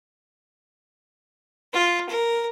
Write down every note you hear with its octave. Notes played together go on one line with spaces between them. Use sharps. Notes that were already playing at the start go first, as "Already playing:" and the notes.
F4
A#4